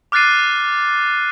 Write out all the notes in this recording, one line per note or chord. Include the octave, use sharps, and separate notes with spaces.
D6 F6 F#6 A6 C7 D#7